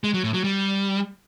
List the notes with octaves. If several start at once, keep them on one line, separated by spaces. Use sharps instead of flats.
G#3
F#3
A2
F#3
G3